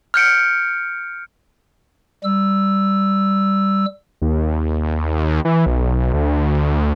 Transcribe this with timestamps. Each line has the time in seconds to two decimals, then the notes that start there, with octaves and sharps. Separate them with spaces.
0.14 F6 G6 C#7 D7
2.24 G3 E6
4.22 D#2
5.45 E3
5.66 B1
6.14 D2